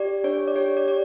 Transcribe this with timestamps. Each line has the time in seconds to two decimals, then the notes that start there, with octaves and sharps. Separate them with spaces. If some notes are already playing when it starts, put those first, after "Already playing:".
Already playing: G4 D5
0.24 D4 C#5
0.48 D5
0.55 G4 C#5
0.77 D5
0.88 G4 D5